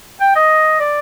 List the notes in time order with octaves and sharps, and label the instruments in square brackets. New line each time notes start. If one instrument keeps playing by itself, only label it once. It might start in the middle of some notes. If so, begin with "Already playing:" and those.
[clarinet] G5
D#5
D5